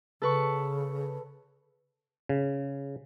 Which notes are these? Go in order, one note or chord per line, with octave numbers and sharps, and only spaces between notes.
C#3 A4 B4 C#6
C#3